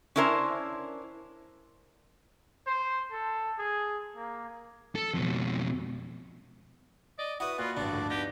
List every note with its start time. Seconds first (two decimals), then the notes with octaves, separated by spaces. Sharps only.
0.16 C#4 D4 E4 A#4 C5
2.67 C5
3.12 A4
3.59 G#4
4.15 A#3
4.95 A4
5.14 F2 B2
7.19 D5 D#5
7.40 E4 F#4 B4 D#6
7.59 A#2 F4 F#4 B5 F#6
7.77 A1 G2 D4 D5
7.91 D2 A2 F3
8.10 B3 D#4 G4 D5 A#6